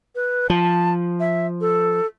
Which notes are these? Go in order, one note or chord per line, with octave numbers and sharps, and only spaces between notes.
B4
F3 A5
E5
A4